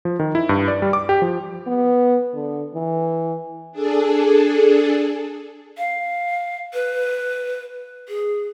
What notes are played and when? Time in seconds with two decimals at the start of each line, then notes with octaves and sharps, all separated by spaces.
0.05 F3
0.19 D#3
0.35 E4
0.49 G2
0.68 D5
0.82 G3
0.93 D6
1.09 G4
1.22 F3
1.67 B3
2.33 D3
2.74 E3
3.72 D4 G#4 A4
5.78 F5
6.73 B4
8.09 G#4